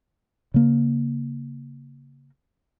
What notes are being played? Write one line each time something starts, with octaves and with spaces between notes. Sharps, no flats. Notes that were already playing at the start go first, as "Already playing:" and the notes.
C#3 A#3